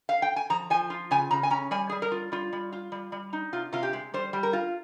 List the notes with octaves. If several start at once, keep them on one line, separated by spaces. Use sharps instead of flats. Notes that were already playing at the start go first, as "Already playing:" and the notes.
F5
G5
G#5
F3 A#5
F3 G#5
F4
C#3 G#5
C#3 A#5
G#5
C#4 A#5
G3 G#5
G3 G#4
A#4
F4
G3 F4
G3
F4
G3
G3
D#4
C3 F4
C3 F4
G4
G#3
G3 C5
G3
A#4
F4